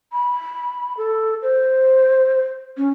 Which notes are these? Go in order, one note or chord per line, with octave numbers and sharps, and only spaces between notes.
B5
A4
C5
C#4